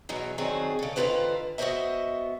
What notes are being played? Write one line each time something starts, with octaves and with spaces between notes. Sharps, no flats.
E2 B2 E3 F#3
D#3 F#3 C4 D4 G#4
C#3 A4
D3 D#3 B3 F4 B4 C5
B3 F#4 G#4 C5 D#5 E5